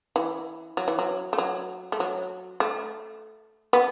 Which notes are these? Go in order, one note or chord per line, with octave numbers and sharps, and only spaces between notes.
E3
F#3
E3
F#3
A3
F#3
A3
F#3
A3
B3